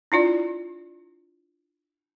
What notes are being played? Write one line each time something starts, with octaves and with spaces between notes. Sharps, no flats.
D4 E4 F4 D5